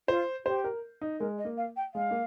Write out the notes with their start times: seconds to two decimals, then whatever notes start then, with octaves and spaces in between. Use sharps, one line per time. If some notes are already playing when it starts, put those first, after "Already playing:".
0.08 F4 C5
0.45 G4 C5
0.64 A#4
1.02 D#4
1.19 G#3 A#4
1.38 D#5
1.45 A#3
1.57 F5
1.76 G5
1.94 G#3 F5
2.11 A#3